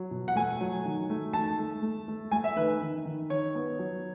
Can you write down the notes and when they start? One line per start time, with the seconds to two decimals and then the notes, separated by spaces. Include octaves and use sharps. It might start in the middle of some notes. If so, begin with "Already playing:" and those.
Already playing: F#3
0.11 B2
0.28 F#5
0.36 A3 G#5
0.61 F#3
0.85 D#3
1.10 A3
1.33 D#3 A5
1.59 A3
1.82 A3
2.08 A3
2.31 A3 G#5
2.44 E5
2.56 D#3 B4
2.81 D#3
3.05 D#3
3.30 D#3 C#5
3.55 B3
3.79 F#3